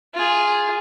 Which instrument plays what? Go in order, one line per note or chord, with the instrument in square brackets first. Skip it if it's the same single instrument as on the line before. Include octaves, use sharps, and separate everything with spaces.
[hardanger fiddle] F4 G#4